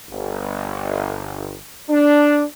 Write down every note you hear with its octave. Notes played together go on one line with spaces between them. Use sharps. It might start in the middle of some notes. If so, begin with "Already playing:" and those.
G1
D4